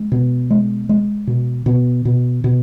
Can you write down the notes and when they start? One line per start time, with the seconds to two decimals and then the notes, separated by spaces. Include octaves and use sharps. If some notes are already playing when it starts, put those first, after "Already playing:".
Already playing: G#3
0.12 B2
0.50 G#3
0.89 G#3
1.27 B2
1.66 B2
2.05 B2
2.44 B2